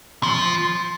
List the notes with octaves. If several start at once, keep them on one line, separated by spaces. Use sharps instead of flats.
F3